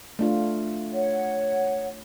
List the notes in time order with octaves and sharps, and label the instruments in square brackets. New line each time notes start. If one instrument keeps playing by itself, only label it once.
[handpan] A3 D4 F4
[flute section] C#5 F#5